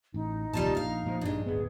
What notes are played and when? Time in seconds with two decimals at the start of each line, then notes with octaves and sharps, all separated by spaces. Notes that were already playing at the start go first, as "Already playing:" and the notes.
0.14 A1 D#4
0.53 D#1 C2 A#2 G3 F4 A5
0.75 A#1 A#4 F5
1.06 A#2 F3
1.21 A#1 G2 G#3 D4
1.46 D1 C#2 B3 G#4